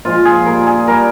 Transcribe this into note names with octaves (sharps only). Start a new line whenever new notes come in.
A#2 F3 G#3 F4
G#4
A#2 G3 A#4
G#4
G3 A#4